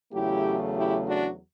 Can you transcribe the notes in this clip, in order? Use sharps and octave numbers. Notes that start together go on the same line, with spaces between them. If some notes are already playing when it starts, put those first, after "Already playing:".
E2 C#3 F#3 A3 E4 G4
E4 G4
D4 F#4